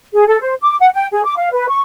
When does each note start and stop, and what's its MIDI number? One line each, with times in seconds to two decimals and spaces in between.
0.14 0.24 68
0.27 0.39 69
0.41 0.54 72
0.63 0.76 86
0.80 0.89 78
0.94 1.06 79
1.12 1.24 68
1.25 1.35 86
1.37 1.50 77
1.52 1.69 71
1.69 1.82 85